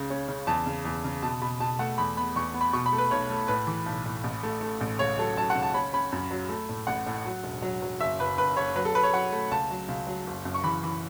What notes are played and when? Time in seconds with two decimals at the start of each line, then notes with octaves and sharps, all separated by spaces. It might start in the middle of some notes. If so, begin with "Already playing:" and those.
Already playing: C#2 C#3
0.10 C#4
0.28 C#3
0.47 E2 A5
0.66 C#3
0.85 E2
1.04 C#3
1.22 B2 A5
1.41 B2 B5
1.60 B2 A5
1.79 A3 F#5
1.98 E2 B5
2.17 B3 B5
2.36 E2 C#6
2.54 B3
2.61 B5
2.73 B2 C#6
2.86 B5
2.93 A3
2.98 B4
3.11 B1 C#5
3.30 A3
3.48 A2 B4
3.67 E3
3.86 B1
4.06 A2
4.24 A1
4.43 A3
4.61 A3
4.81 A1
4.99 C#2 C#5
5.18 F#3 A4
5.37 F#3 A5
5.50 F#5
5.55 C#2
5.63 A5
5.74 C#4 B5
5.93 C#4 B5
6.12 F#2
6.31 F#3
6.49 A3
6.69 A2
6.87 A1 F#5
7.06 A2
7.26 F#3
7.43 E1
7.62 F#3
7.82 F#3
8.00 F#1 E5
8.20 F#1 B4
8.38 F#1 B4
8.57 F#1 C#5
8.75 F#3 B4
8.85 A4
8.94 F#3 B4
9.03 C#5
9.13 F#3 F#5
9.32 A3
9.51 C#2 A5
9.70 F#3
9.89 C#2
10.07 F#3
10.27 F#1
10.45 F#2
10.54 C#6
10.64 E3 B5
10.83 E3